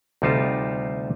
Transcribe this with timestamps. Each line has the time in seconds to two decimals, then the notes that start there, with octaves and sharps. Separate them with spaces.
0.22 D2 C3 G3 D#4 F4 A5